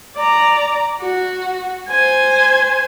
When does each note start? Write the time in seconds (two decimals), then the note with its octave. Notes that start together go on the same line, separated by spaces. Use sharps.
0.16 D5 A#5
1.00 F#4
1.89 C5 G#5